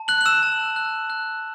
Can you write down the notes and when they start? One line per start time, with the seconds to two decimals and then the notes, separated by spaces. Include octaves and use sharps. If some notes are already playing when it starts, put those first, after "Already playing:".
Already playing: A5
0.08 F#6 F#7
0.21 F#7
0.26 E6 E7
0.43 A5
0.76 F#6
1.10 F#6